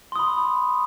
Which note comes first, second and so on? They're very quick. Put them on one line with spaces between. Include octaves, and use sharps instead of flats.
C6 D#6 B5